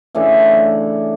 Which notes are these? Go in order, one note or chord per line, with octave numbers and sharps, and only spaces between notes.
C#3 E3 A3 D4